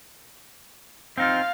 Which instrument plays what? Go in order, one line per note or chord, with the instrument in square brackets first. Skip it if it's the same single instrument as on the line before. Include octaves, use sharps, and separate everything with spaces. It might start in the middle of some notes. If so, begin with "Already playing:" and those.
[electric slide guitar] C4 D#4 F4 [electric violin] F5